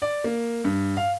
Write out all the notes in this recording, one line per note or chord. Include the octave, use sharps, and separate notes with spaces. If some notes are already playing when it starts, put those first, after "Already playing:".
D5
A#3
G2
F5